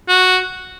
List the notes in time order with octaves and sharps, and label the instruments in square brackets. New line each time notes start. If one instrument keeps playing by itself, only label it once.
[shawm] F#4